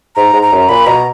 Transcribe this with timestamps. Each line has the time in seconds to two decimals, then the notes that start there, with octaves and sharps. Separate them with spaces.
0.16 G#2 A#5
0.33 G#2
0.43 A#5
0.52 F#2
0.69 A#2 B5
0.86 B2 A#5